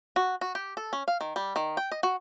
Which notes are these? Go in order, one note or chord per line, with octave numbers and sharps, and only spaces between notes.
F#4
F#4
G4
A4
C#4
F5
D#3
G3
D#3
G5
D#5
F#4